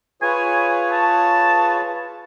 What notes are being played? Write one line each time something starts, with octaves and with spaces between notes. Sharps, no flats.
F4 G#4 B4 C#5 G#5 C#6
A5